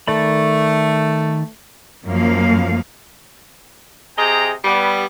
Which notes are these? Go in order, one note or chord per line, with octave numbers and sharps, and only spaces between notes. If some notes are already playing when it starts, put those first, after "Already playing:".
D#3 A3 D5 B5
F#2 F3 A#3 F5
C3 G#4 D#5 G5 A#5
G3 B3